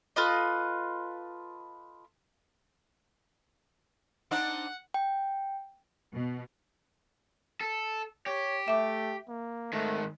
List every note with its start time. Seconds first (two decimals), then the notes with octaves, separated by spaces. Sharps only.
0.16 F4 A4 B4 D#5
4.31 C4 D4 D#4 F#5
4.94 G5
6.13 B2
7.61 A4
8.26 G4 C#5
8.68 A3 E5 D6
9.28 A#3
9.73 G#2 D#3 A3